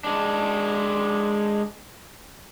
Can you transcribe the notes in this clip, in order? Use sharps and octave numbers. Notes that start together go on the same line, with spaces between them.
G#3 D4